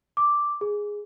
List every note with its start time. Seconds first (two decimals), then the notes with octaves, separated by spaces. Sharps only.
0.17 D6
0.61 G#4